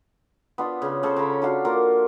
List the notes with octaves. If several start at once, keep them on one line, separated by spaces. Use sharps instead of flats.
B3 D4 F4
C#3
C#3 C#4 A4 C5
C#3 A#5 B5
D4 F#4 F5
A#3 F4 A#4 F#5